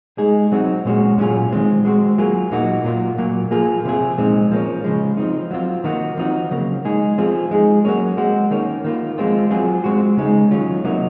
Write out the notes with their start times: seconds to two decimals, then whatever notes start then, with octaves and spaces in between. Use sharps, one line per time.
0.18 G#3 D#4 G#4
0.52 F#3 C4 D#4 F#4
0.85 A#2 G#3 C#4 F#4
1.18 A#2 F#3 C#4 F4 G#4
1.52 D#3 G#3 C4
1.85 G#3 C4 F#4
2.18 F#3 A#3 F4 G#4
2.51 A#2 F#3 A#3 D#4 F#4
2.84 A#2 F#3 A#3 F4
3.18 A#2 F#3 A#3
3.51 F3 A#3 F4 G#4
3.85 C3 F3 C4 F4 G#4
4.18 A#2 G#3 C4 D#4
4.51 F3 A#3 C#4
4.84 C#3 F3 G#3
5.17 F3 C4 D#4
5.51 F#3 C4 F4
5.84 D#3 A#3 D#4 F#4
6.17 F3 C4 D#4 F#4
6.51 C#3 F#3 A#3
6.85 G#3 D#4 G#4
7.18 F3 C4 F4 G#4
7.51 G#3 D#4 G#4
7.85 F#3 A#3 C#4
8.17 G#3 C4 F#4
8.51 D#3 A#3 C#4
8.84 D#3 A#3 F4
9.18 F3 G#3 C4 F4
9.50 F#3 C4 F4 G#4
9.84 G#3 C4 F#4
10.17 C#3 G#3 D#4
10.51 D#3 F#3 C#4 F4
10.84 C3 F#3 A#3 D#4